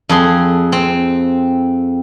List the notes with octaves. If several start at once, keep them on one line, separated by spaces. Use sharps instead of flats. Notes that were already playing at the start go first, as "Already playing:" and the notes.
F2 G#4 C6
C4